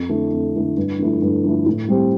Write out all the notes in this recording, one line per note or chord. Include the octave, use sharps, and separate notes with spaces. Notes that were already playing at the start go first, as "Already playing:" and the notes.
Already playing: F2
D3 A3 E4
F2
D3 A3 E4
G2
D3 F3 A3 E4
G2
D3 F3 A3 E4
A2
G3 C4 G4